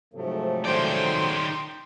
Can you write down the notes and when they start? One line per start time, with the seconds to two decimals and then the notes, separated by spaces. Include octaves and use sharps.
0.14 G#2 C3 F3 F#3 A3
0.65 D#3 D5 G5 C6